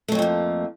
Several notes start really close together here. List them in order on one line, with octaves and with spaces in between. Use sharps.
A3 F#3 F2 F3 A#3